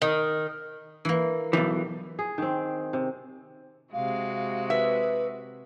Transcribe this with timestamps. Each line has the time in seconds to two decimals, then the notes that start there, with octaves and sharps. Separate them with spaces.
0.02 D#3
1.05 E3 A#3
1.53 B1 E3 G4
2.19 G#4
2.38 D#3 C4
2.93 C3
3.93 C3 G#3 F#4 F5
4.70 B4 E5